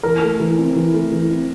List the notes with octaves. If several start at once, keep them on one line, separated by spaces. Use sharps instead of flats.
E3 A#4
A3
E3
C4
E3
A3
E3
C4